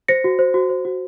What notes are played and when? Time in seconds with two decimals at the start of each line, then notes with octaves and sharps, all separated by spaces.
0.08 C5 A#6 C#7
0.24 F#4
0.39 C5
0.54 F#4
0.69 C5
0.85 F#4